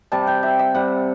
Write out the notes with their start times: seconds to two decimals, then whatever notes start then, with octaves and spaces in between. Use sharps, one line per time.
0.12 C3 G3 A5
0.27 G5
0.43 E5
0.59 E5
0.75 C3 G3 F#5